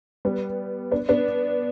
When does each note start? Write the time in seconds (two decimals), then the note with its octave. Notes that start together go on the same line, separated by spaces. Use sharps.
0.25 G3 B3
0.91 B3 D4
1.09 B3 D4